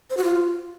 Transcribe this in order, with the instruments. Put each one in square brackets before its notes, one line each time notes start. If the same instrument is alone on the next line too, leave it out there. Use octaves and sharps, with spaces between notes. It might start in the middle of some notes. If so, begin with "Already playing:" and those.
[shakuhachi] C5
F#4
F4